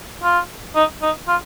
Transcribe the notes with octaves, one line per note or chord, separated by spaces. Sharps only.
F4
D#4
D#4
F4